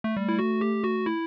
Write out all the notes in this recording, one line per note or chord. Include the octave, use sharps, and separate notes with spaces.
A3
G3 A3
E4
F#4
G4
F#4
E4